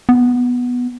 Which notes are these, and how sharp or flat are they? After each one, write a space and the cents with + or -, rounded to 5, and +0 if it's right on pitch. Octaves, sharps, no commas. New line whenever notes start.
B3 -5